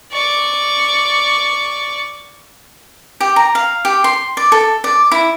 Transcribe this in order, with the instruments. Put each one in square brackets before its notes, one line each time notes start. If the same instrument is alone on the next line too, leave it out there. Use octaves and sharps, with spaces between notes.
[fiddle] D5 C#6
[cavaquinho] G4
A#5
F5
G4
C6
D5
A4
D5
E4